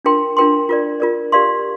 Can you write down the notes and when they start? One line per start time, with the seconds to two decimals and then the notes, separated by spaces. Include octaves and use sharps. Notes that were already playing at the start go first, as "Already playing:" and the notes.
0.05 D4 F4 A#4 G5 C6
0.37 D4 F4 A#4 G5 C6
0.69 F4 A#4 D5
1.00 F4 A#4 D5
1.32 G4 A#4 D5 F5 C6